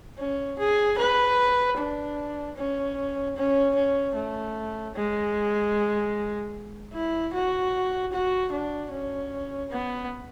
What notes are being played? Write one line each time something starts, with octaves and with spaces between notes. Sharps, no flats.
C#4
G#4
B4
D4
C#4
C#4
C#4
A3
G#3
E4
F#4
F#4
D4
C#4
B3